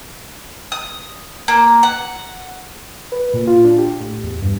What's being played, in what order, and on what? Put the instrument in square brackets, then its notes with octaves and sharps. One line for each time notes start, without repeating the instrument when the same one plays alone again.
[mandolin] D#6
A#3
F#5
[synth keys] B4
A#2
F4
D4
G4
A2
E2
G2